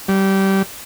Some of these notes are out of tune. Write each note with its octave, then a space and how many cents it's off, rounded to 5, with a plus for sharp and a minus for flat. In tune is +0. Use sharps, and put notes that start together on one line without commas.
G3 -20